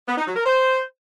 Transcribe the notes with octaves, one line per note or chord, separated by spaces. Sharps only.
B3
D#4
F#3
A#4
C5